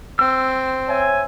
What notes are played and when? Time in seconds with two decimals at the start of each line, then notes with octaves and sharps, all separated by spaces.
0.19 C4 E6
0.88 C#5 E5 G#5